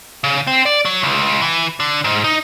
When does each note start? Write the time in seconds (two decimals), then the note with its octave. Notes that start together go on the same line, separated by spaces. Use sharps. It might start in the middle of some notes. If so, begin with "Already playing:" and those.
0.24 C#3
0.47 C4
0.66 D5
0.85 F#3
1.03 C#2
1.42 E3
1.80 D3
2.04 G#2
2.24 D#4